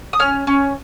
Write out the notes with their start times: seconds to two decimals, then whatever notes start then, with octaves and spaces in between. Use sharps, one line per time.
0.13 D#6
0.19 C#4 F6
0.47 C#4